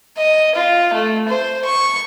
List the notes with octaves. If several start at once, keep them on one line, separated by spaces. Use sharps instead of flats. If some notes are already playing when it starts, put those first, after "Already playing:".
D#5
F4
A3
C5
C#6